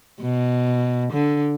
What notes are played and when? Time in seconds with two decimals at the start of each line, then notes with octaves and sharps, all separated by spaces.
0.21 B2
1.13 D3